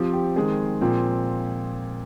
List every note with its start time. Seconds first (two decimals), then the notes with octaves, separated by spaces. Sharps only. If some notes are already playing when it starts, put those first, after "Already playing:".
Already playing: F3 C4 G4
0.14 G4
0.36 D#3 G#3 C4 G#4
0.81 A#2 F3 C4